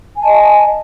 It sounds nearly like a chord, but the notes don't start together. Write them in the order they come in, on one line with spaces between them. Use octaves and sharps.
G#5 A5 D#5